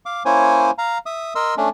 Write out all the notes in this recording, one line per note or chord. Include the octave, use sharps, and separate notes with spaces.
F5 D6
A#3 C#4 E4 C5 C#5 G#5
F5 A#5
E5 D#6
A#4 D#5 C6 E6
A3 C#4 D4